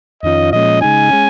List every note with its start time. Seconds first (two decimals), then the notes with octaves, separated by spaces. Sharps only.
0.23 F2 D#3 C#4 F4 D#5
0.52 A#2 F3 G#3 C#4 D#5
0.82 C#3 G#3 D#4 G#5
1.11 G#3 C#4